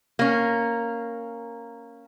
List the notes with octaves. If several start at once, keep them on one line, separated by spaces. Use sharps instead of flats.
A#3 C#4